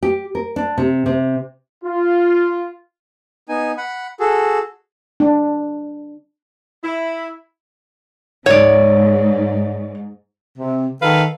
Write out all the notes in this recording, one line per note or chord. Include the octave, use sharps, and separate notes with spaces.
G4
A#4
D4
C3
C3
F4
B3 D#4 G#5
F#5 B5
F#4 G#4 A4
D4
E4
G#2 C#5 D5
C3
D#3 A4 B4 F5